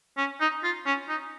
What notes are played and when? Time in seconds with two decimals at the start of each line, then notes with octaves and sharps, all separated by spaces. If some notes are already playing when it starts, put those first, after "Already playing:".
0.17 C#4
0.40 D#4
0.64 F4
0.86 C#4
1.09 D#4